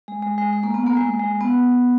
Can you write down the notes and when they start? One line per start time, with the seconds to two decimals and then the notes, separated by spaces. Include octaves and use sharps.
0.08 G#3
0.22 G#3
0.38 G#3
0.53 G#3
0.63 A#3
0.74 B3
0.86 A#3
0.97 G#3
1.20 G#3
1.41 B3